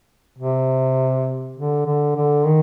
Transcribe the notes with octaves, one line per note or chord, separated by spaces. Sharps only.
C3
D3
D3
D3
D#3